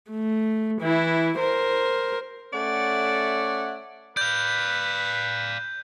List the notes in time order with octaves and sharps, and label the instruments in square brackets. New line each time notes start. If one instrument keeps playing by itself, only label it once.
[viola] A3
E3 E4
A#4 C5
[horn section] A3 C#4 C#5 D5 E5 F#5
[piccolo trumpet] B4 [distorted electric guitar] D5 F5 [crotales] G6